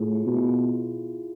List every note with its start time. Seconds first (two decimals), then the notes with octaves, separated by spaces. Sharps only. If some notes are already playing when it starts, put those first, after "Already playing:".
Already playing: A2 F4 G#4
0.15 E4
0.26 B2 F4
0.37 E4
0.47 F4